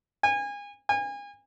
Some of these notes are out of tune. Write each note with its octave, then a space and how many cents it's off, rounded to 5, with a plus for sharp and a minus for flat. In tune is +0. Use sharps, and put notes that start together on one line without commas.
G#5 -30
G#5 -35